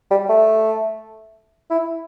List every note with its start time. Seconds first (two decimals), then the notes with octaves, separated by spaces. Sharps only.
0.11 G3
0.29 A3
1.70 E4